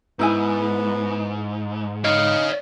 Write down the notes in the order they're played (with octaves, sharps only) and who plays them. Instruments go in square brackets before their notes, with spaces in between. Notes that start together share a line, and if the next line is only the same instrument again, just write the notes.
[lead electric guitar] G#2 [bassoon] B3 [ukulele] D#4 E4 G#5
[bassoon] D#4 [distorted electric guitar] C#5 F5